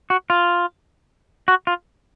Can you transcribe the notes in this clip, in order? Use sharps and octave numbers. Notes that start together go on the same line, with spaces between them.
F#4
F4
F#4
F4